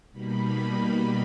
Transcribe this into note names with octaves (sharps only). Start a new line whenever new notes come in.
B2 G3 A#3 D#4 B5